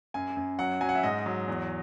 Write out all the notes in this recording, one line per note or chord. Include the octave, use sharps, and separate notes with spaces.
F#2 G#5
F#2
F#3 F#5
F#3 G#5
F#5
E5
G#2 D#5
F#3
E2